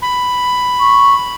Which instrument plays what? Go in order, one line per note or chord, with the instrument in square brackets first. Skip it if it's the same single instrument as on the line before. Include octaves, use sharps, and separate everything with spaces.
[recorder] B5
[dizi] C#6